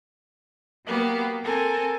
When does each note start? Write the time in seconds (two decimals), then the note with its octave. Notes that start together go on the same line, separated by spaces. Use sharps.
0.86 F#3 A#3 B3 G4
1.43 C4 A4 A#4 G#5